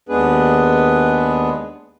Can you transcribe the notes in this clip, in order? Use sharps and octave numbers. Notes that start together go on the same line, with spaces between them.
D#2 G#3 B3 D4 G#4 B4